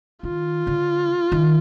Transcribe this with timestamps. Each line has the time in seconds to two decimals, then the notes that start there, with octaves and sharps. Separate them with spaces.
0.23 D#3 F4
0.67 D3
1.32 D#3